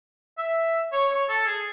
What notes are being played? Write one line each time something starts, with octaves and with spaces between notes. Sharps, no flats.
E5
C#5
C#5
A4
G#4